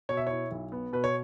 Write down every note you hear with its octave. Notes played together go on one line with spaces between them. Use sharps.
B2 C#5
E5
E4 C#5
B1
B3
B2 B4
C#5